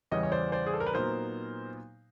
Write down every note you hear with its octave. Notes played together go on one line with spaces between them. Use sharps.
E2 C#3 E3 G3 C#5 D#5
C#5
C5 D5
C5 D5
G#4
A4
A#4
B4
A#2 F#3 B3 D#4 A#4 C5